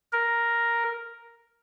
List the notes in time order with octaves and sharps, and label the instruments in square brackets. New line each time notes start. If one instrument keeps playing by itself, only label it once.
[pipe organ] A#4